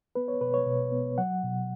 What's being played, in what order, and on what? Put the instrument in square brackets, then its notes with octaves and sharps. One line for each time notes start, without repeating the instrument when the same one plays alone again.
[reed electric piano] B3 B4
C#5
B2 B4
C#5
B2
B3
F#3 F#5
B2